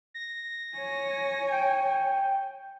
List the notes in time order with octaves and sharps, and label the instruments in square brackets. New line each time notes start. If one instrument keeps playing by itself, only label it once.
[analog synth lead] A#6
[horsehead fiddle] C#5 G#5
[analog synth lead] G5